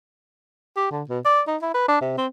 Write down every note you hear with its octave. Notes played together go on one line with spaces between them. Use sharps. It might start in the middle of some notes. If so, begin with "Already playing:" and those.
G4
D3
B2
D5
D#4
E4
B4
D4
C3
C4